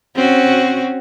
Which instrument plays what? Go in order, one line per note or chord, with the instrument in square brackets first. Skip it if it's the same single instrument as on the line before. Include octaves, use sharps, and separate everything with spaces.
[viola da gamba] C4 C#4 F#4